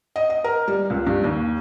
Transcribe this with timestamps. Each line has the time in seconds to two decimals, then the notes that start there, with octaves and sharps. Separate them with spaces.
0.16 D#5
0.30 D#5
0.44 A#4
0.68 G3
0.90 C#2
1.07 G2
1.24 D#2